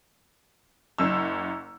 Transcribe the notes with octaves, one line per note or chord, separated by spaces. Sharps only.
F#1 F#2 E6